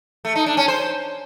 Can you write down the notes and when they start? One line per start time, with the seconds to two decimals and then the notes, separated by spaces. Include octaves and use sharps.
0.25 A3
0.35 D#4
0.46 D4
0.57 C#4
0.68 C5